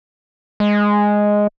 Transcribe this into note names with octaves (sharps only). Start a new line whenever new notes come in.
G#3